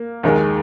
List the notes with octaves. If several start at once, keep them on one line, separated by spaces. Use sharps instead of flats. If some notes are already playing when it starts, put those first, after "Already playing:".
Already playing: A#3
D#2 D#3 G#3